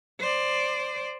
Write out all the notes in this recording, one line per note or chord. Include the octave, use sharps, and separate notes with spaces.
C5 D5